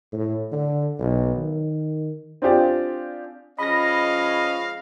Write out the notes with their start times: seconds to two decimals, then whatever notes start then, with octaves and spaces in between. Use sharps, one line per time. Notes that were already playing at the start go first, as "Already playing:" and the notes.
0.12 A2
0.52 D3
0.99 B1
1.36 D#3
2.42 C4 D4 F4 G4 G#4 D5
3.59 F3 G#3 C#4 D#5 F5 B5 A#6